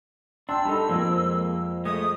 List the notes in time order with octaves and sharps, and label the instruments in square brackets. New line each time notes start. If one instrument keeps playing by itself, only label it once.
[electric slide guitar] D4 [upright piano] G5 A5 C6 [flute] E6
[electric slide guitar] G3 D4 D#4 [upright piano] A4 B5
[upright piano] F2 [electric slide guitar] G#3 A#3
[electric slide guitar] G#3 A3 [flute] D#6